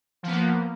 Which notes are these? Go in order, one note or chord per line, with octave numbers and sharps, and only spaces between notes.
F3 A#3 B3